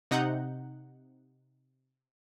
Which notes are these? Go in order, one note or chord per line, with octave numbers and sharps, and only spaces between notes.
C3 D#4 F#5 A#5 G6